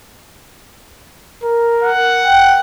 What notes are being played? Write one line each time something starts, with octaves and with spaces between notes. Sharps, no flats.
A#4
F#5
G5